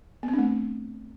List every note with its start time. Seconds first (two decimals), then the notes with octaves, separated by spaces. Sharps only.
0.23 B3
0.28 C4
0.33 D4
0.39 A3